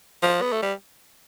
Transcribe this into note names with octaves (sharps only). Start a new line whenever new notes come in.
F3
B3
A3
G3